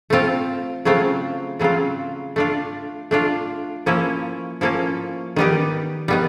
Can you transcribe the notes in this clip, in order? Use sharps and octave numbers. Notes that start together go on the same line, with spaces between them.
A3 C4 F4
C#3 F#3 A3 C4 F4
C#3 F#3 A3 C4 F4
A3 D4 F4
A3 D4 F4
F3 A#3 C#4 E4 A4
F3 A#3 C#4 E4 A4
D#3 G3 B3 D#4 G4
D#3 G3 B3